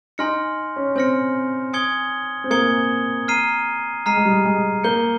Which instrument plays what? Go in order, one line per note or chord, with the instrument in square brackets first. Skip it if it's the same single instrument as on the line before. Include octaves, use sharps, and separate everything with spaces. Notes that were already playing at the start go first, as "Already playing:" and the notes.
[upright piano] D#4 [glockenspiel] G#5 C6 F6 A#6 C#7
[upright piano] C#4
[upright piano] C4 [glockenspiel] G#5 C6 F6 A#6 C#7
[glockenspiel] G#5 D#6 G#6 C#7 G7
[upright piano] C4
[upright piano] A#3 [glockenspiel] G#5 D#6 G#6 C#7 G7
[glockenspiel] A#5 F6 C7 D#7
[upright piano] G#3 [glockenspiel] A#5 F6 C7 D#7
[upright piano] G#3
G3
G#3
[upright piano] A#3 [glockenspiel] G6 C#7 G7